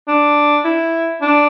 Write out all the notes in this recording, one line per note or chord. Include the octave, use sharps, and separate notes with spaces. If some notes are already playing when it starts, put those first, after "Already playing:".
D4
E4
D4